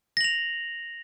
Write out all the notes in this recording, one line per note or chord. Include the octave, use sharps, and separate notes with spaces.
A#6 F7 F#7